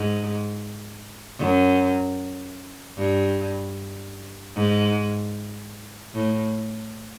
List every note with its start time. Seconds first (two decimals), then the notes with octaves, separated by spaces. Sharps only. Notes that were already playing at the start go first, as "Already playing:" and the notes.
Already playing: G#2
1.38 F#2
2.97 G2
4.55 G#2
6.14 A2